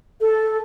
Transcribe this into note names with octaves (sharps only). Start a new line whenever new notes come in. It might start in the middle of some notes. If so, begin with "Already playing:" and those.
A4